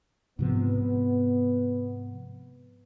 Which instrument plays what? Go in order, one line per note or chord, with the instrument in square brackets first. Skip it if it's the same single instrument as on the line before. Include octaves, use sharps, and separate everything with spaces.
[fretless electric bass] G#2 C3 F3 [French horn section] B3